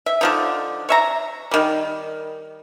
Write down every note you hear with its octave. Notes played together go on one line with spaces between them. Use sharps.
E5
D3 F3 D#4
C#5 E5 A#5
D#3 G3